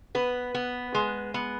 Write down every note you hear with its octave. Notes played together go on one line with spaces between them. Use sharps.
B3 B4
B3
G#3
B3